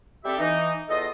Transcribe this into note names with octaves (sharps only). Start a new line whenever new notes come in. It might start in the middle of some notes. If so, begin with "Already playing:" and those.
G3 C4 G4 A4 E5
E3 D#4
E2 F4 A4 D#5